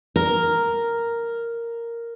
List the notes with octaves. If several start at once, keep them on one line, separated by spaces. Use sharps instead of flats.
A#4